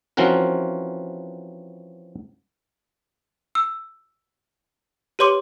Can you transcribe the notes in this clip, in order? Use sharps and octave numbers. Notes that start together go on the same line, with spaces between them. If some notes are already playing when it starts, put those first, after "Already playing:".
E3 F3 C4 C#4 F#4 A#4
E6
G4 B4 C#5 C6 D6